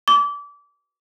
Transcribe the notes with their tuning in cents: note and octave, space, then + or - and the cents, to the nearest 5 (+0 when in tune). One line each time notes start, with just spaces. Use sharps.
D6 -25